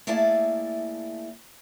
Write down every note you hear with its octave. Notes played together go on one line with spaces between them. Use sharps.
A3 A#3 E4 G#4 D5 A5